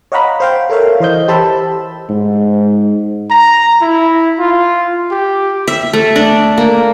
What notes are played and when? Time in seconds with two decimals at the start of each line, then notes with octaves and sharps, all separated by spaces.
0.12 C#5 D#5 F5 F#5 A#5 B5
0.40 C5 F5 G5
0.69 A4 A#4 C#5 E5 F5
1.00 E3 C5 D#5 G6
1.28 G4 C5 A5 B5 E6
2.09 G#2
3.31 A#5
3.82 E4
4.40 F4
5.11 G4
5.68 E5
5.93 A3
6.16 D4
6.58 A#3